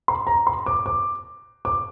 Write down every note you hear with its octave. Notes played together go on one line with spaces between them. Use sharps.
C6
A#5
C6
D6
D6
D6